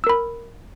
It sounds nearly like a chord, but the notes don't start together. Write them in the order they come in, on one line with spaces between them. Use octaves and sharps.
E6 A#4 B5